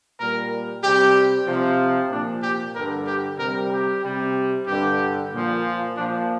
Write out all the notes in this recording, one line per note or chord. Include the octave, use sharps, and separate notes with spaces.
A#2 G3 A#4
C3 G3 G4
C3 F3
A#2 F3 D4
G4
G2 D3 G3 A#4
G4
C3 G3 A#4
G4
C3 G3
G2 D3 G3 G4
A#2 F3
A#2 F3 D4